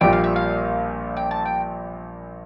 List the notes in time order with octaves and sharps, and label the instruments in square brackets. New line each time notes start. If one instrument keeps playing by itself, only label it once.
[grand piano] A#1 A#2 G3 [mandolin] G5
[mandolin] F5
E5
F5
G5
A5
G5